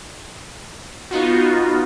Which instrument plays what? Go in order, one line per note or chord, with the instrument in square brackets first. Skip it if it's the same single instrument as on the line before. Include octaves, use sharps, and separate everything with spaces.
[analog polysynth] B3 D#4 F4 F#4